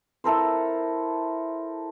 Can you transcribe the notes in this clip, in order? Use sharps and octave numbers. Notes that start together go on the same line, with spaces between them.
E4 A4 A#4 C5